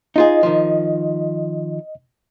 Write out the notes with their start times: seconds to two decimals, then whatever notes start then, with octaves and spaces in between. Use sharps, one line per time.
0.16 D#4 F4 G#4 D#5
0.43 D#3 F3